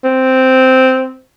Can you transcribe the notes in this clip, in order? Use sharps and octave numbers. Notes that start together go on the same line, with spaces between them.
C4